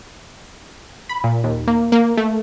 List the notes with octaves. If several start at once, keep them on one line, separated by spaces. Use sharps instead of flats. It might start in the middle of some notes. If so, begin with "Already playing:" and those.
B5
A#2
D#2
A#3
A#3
A3